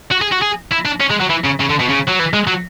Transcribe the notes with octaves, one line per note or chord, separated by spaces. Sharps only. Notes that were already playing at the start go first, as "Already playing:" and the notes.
F#4
G#4
F#4
G#4
E4
D4
C#4
G#3
F#3
E3
C#3
C#3
D3
B2
C#3
F#3
E3
G#3
F#3